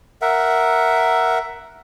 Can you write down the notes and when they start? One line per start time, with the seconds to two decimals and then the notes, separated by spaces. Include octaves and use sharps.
0.22 A#4 E5 F#5